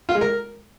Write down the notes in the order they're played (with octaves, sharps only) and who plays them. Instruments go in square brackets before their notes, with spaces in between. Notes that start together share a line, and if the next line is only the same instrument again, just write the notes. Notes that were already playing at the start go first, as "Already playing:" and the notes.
[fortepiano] F4
G#3
A#4